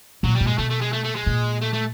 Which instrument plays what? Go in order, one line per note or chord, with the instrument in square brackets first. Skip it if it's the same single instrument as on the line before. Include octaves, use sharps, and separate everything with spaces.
[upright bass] A#2 [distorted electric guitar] F#3
[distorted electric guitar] G3
[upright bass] A#2
[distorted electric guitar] G#3
[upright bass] B2 [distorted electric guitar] A3
[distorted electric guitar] A3
G#3
A3
A3
G#3
[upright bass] A#2
[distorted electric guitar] A3
A3